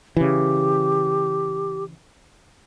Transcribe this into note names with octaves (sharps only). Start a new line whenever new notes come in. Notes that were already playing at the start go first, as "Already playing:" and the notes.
C#3 E3 G4